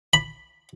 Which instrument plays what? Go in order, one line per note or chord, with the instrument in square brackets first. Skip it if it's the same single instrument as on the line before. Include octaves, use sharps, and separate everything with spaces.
[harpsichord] B5